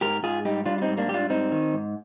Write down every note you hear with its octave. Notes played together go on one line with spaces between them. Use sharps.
G#2 G4 A#4
G#2 F4 G#4
G3 D#4 G4
G3 D4 F4
F4
C4 D#4
G#2
A#3 D4
G3 G4
D4 F4
G#2 C4 D#4
D#3
G#2